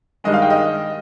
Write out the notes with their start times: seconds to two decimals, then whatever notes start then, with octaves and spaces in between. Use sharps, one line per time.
0.24 G2 D#3 G#3 D#5
0.34 F5
0.42 G5
0.50 D#5